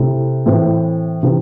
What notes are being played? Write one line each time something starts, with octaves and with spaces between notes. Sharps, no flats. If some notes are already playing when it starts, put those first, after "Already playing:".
Already playing: C3 A3 E4
A2 E3 C4
C3 E3